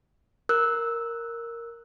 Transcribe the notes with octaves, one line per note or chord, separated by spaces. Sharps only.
A#4 E6 F#6